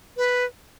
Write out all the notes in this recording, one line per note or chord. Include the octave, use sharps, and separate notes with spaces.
B4